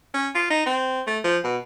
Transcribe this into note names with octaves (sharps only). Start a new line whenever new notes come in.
C#4
F4
D#4
C4
A3
F3
B2